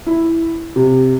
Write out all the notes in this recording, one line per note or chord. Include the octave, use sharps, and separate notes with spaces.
E4
C3